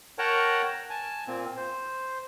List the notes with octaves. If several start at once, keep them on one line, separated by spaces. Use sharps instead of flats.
A#4 C#5 F#5 G5 A5 A#5
G#5 A5
A#2 A#3 C4
C5